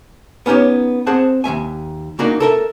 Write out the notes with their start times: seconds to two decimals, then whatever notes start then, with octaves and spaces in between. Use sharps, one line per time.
0.46 B3 C#4 D#4 G4 C#5
1.07 C4 G#4 C5 F#5 A5
1.44 D#2 F#3 E5 G#5
2.19 C#3 A#3 D4 D#4 F#4 A#4
2.40 A4 A#4 E5